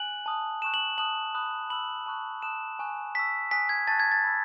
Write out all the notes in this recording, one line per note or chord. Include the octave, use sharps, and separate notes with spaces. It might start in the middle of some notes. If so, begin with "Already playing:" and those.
Already playing: G#5 F#6 F#7
A5 D#6 F#6
A5 C#6 F#6 E7
F#7
A5 D#6 F#6 F#7
B5 D#6 F#6
B5 E6 F#7
A5 C#6 F#6
A5 D#6 F#6 E7
G#5 C#6 F#6
A5 C#6 E6 B6
G#5 D#6 F#6 B6
G#6
A5 C#6 F#6 A6
G#6
A6
B5 E6